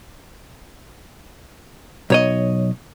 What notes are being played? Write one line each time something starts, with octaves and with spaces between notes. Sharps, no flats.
B1 C#5 D#5